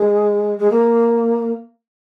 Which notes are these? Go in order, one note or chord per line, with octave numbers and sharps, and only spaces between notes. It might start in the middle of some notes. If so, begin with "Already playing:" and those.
Already playing: G#3
G#3
A#3